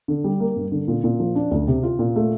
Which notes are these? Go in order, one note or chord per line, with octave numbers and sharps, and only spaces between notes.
D3
G3
A#3
G2
D3
A#2
A#2
F3
D4
D2
C3
F4
A#2
A3